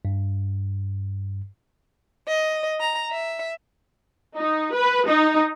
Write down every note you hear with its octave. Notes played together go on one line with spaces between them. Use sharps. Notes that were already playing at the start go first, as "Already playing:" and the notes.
G2
D#5
A#5
E5
D#4
B4
D#4